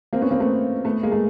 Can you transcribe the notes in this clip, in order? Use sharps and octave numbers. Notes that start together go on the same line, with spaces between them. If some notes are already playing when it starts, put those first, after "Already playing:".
A#3 C4
B3 C#4
A#3 C4
A3 B3
A3 B3
G#3 A#3
A3